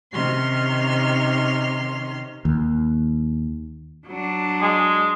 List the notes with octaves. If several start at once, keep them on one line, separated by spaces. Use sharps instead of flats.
C3 D#3 C#4 C6 F6
D#2
F#3 D4
G#3